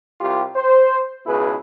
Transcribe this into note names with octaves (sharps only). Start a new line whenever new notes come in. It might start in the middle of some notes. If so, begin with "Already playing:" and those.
C2 F4 G4
C5
C#2 B2 E4 G#4 B4